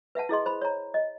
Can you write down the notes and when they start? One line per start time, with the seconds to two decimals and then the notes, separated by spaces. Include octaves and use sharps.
0.15 B4 E5 F#5 A5
0.29 E4 G#4 D#5 C6
0.46 C5 B5
0.61 C#5 A#5
0.94 D#5